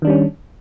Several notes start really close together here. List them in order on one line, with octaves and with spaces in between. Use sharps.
D#3 D4 G3 C#4